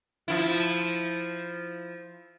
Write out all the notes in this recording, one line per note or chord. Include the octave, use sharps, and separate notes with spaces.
F3 E4